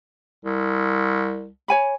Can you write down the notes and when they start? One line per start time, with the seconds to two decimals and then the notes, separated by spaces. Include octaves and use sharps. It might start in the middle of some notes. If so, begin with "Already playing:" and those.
0.45 C2
1.68 C#5 G#5 B5